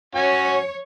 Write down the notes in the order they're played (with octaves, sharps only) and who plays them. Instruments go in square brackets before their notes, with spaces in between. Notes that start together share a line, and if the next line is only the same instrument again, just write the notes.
[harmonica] C#4 F#4 G#5 [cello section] C#5